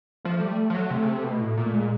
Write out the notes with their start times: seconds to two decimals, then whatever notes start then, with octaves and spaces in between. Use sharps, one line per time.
0.25 F3 A3
0.41 G3
0.70 F3
0.75 F#3
0.90 C3
1.03 C#3
1.08 C3
1.23 B2
1.41 A2
1.57 A#2
1.66 A3
1.73 A#2 G#3